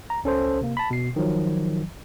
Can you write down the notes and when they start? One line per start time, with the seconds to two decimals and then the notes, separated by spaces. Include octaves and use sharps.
0.10 A#5
0.24 C#2 C#4 A4 C5
0.61 C3 A#3
0.77 A5 B5
0.91 B2 C7
1.16 D#3 F3 F#3